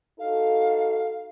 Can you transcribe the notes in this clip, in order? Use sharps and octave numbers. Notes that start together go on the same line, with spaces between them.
D#4 F#4 A4 F5